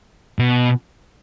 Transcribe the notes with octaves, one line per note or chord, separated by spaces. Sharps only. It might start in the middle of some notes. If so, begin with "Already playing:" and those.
B2